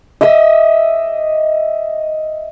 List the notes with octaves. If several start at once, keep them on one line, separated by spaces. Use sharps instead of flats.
D#5 E5 D6 E6